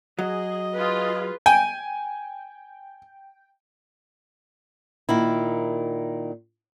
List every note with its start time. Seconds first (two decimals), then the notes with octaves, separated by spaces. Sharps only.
0.19 F#3 G#4 D#5
0.74 F4 G#4 B4
1.46 G5 G#5
5.09 A#2 D#3 E4